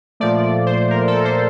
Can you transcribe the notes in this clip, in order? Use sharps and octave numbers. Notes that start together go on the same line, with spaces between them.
A#2 F3 A3 D5
D5
C5
A#4
A4
C5